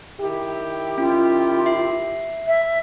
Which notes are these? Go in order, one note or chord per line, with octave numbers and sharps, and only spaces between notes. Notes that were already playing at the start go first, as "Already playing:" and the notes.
D#3 E4 G4
C#4 F4
E5 C7
E5